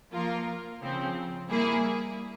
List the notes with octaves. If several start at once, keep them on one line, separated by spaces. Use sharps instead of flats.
F3 A#3 F4 A#4
C#3 F3 C4
G3 A#3 E4 G#4